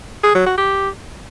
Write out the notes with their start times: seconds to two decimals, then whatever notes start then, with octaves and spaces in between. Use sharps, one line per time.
0.23 G#4
0.35 F#3
0.46 F#4
0.58 G4